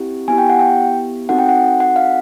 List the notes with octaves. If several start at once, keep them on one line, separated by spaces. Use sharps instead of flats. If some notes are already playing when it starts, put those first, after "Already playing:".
Already playing: C4 E4 G4
B3 E4 G4 G#5
G5
F#5
G5
C4 D#4 F#4 A4 F#5
G5
F#5
F#5
F5